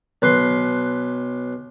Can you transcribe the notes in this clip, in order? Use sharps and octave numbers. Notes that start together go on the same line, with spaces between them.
B1 B4 C6